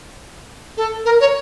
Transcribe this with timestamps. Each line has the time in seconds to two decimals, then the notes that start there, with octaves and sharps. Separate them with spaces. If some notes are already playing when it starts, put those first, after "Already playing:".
0.77 A4
1.05 A#4
1.20 C#5